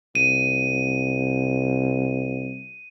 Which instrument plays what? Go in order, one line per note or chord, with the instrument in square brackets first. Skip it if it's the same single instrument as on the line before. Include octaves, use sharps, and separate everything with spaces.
[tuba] C2 [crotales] D#7